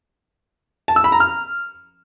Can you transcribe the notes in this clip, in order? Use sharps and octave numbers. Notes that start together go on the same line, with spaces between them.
A5
E6
B5
A#5
F6